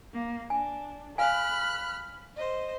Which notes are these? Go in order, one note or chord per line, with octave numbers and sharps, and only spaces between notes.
A#3
D4 G#5
F5 G#5 B5 F6 F#6
C5 D#5